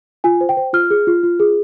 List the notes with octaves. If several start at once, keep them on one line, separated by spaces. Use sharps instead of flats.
F4 G#5
C5
G5
C5
F4 F6
G#4
F4
F4
G#4